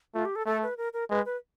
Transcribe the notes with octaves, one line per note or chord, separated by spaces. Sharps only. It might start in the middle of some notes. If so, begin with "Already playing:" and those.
A3 F4
G4
A4
A3 A4
B4
A#4
A#4
G#3 B4
B4